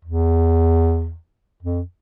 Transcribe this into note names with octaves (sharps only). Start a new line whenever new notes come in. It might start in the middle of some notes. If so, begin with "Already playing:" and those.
E2
F2